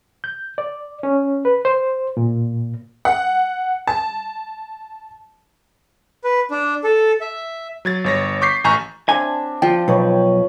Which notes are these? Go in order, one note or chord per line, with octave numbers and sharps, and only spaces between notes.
G6
D5
C#4
B4
C5
A#2
F#5
A5
B4
D4
A4
E5
F#3 G#6 A6
G1 C#5 A#6
C#6 D6 G6 B6 C7
A1 G#5 A#5 C#6 G6
C4 D4 E5 G#5
F3 D5 D#5 G5 A5
B1 B4 C#5